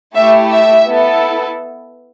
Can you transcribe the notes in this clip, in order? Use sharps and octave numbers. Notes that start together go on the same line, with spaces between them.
A3 E4 G4 E5
E5
B3 E4 A4